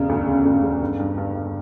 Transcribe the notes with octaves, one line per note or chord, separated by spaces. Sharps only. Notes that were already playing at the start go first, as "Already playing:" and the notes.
Already playing: E1 C#3
D2
C#3
D2
E1
G2
G2
G2
G2